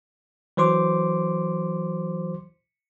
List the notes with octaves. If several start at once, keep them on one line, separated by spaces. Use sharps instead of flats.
E3 F#3 C5 C6 D6